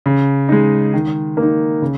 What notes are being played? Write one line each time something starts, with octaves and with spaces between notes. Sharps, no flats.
C#3
G#3 D#4
D#3
A#3 D#4
C#3